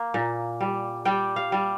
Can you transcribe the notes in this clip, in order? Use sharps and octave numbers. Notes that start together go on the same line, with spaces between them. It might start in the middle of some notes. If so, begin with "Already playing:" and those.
Already playing: A#3
A#2
G3
G3 G5
F5
G3